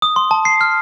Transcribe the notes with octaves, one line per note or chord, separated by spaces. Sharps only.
D#6
C6
A5
C7
F6